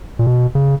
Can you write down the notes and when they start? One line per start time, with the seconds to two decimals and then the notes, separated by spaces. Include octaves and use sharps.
0.19 A#2
0.27 B2
0.55 C#3